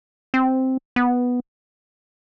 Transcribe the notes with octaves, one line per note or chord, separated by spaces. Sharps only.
C4
B3